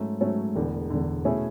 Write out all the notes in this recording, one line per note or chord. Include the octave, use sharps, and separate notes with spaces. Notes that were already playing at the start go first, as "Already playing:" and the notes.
Already playing: G#2 F#3 A3 C#4
G#2 F#3 A3 C#4
E1 E2 D3
E1 E2 D3
B2 A3 C#4 E4 G#4